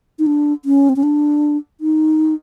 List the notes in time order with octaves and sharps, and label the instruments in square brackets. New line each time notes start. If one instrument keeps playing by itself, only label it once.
[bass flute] D#4
D4
C#4
C4
C#4
D4
D#4